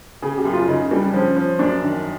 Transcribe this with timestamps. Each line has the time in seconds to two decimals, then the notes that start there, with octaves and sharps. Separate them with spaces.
0.22 C#3 G#4
0.38 G4
0.45 F#2
0.53 F4
0.68 C#3 D#4
0.91 G3 D4
1.14 F3 C#4
1.37 F3
1.59 F#2 D4
1.82 D#3